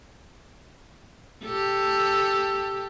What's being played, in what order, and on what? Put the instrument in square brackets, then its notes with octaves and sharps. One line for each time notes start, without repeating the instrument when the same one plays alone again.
[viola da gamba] G4 A4